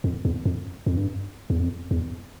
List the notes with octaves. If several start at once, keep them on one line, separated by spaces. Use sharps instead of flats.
F2
E2
F2
F2
G2
E2
F2
E2